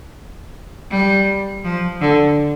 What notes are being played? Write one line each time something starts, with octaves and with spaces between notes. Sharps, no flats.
G3
F3
D3